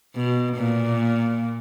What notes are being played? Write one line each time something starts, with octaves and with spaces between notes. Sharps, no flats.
B2
A#2